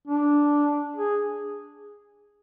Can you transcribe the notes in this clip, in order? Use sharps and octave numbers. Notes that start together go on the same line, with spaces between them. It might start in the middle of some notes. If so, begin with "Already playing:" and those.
D4
G#4